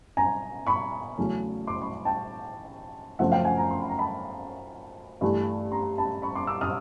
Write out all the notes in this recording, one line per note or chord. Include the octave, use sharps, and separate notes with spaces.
G#5 A#5
B5 C#6
E2 C#3 F#3 A3 C#4
C6 D6
B5 C#6
G5 A5
F#2 C#3 F3 A3 C4 E5 F#5
F5 G5
F#5 G#5
G#5 A#5
C6
B5
A#5
A5 B5
G2 E3 A3
A#5 C6
A5 B5
B5 C#6
C6 D6
D6 E6
D#6 F6